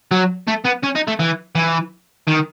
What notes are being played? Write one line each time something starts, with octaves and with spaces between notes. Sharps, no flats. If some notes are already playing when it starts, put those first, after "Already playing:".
F#3
A3
B3
C#4
D#4
A3
E3
E3
D#3